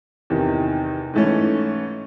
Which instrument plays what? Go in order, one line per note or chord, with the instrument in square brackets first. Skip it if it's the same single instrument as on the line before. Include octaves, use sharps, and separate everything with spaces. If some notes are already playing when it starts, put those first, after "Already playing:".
[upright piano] E2 C3 D#3
G#2 E3 A3 C#4